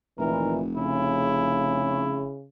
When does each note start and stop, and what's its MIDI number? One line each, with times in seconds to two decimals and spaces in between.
0.19 2.26 29
0.19 0.61 46
0.19 0.61 51
0.19 0.61 52
0.19 0.56 70
0.76 2.44 49
0.76 2.37 64